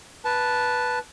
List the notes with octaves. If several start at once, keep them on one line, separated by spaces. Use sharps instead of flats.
B4 A5